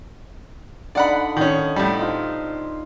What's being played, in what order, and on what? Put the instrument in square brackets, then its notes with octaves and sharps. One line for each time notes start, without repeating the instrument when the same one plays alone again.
[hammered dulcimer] D3 D#4 F5 [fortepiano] D5 F#5 B5
[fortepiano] D#3 C#4
A2 G3
[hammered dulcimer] D#4 F4 C5